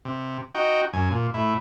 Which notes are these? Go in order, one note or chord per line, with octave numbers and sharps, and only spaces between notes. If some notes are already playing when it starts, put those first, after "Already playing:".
C3
D#4 F#4 G5
F#2 G#5
A#2
A2 E4